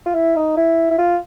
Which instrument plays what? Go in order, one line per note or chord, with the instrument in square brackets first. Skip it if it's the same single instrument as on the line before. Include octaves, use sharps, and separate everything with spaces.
[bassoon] F4
E4
D#4
E4
E4
F4